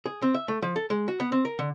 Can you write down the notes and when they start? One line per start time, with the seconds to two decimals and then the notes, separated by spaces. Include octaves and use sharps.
0.06 G#4
0.22 C4
0.34 E5
0.48 A3
0.62 F3
0.76 A4
0.90 G#3
1.08 F#4
1.20 B3
1.32 C4
1.45 A#4
1.59 D3